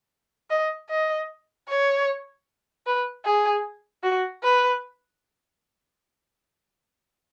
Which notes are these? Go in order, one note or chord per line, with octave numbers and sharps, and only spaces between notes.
D#5
D#5
C#5
B4
G#4
F#4
B4